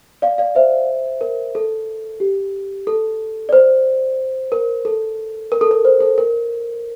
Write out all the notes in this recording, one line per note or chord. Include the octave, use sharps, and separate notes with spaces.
D5 F5
D5 F5
C5 E5
A#4
A4
G4
A4
D5
C5
A#4
A4
A#4
A4
A#4
C5
A4
A#4